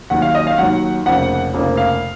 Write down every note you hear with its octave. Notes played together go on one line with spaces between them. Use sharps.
D#2 D#3 F#3 F#5
F5
D#5
F5
D#2 D#3 F#3 F#5
F1 F2 C#3 F3 A#3 F#5
F1 F2 C#3 F3 A#3
F5